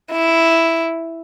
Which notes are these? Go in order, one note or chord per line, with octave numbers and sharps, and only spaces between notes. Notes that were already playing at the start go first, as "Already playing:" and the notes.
E4